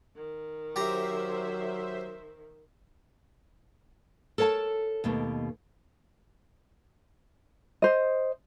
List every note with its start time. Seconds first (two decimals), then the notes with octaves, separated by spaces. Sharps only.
0.16 D#3
0.76 F#3 G4 C5 E5 A#5
4.38 A4 A#4 C#5 F5 A5
5.04 D#2 B2 A3 A#3
7.82 C5 D#5